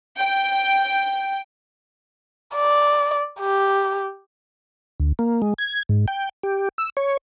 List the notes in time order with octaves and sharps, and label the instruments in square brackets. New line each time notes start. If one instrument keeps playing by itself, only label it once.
[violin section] G5
[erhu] D5
G4
[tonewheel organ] D2
A#3
G#3
G#6
G#2
G5
G4
E6
C#5